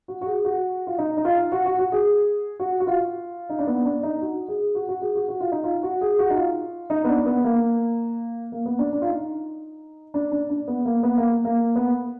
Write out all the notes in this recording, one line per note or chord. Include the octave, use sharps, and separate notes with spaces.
F#4
F#4
G#4
F#4
F4
D#4
D#4
F4
F#4
F#4
F#4
G#4
F#4
F#4
F4
D#4
D4
B3
D4
D#4
F#4
G#4
F#4
F#4
G#4
F#4
F#4
F4
D#4
F4
F#4
G#4
F#4
D#4
F4
D#4
B3
D4
B3
A#3
A#3
B3
D4
D4
F4
D#4
D4
D4
D4
B3
A#3
B3
A#3
A#3
B3